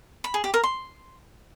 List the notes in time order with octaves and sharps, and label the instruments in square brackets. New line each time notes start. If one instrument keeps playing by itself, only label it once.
[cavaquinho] B5
G#4
G4
A#4
C6